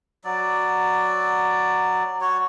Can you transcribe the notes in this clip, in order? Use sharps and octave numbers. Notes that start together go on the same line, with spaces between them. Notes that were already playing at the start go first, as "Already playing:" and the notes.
F#3 D5
F#4 C#5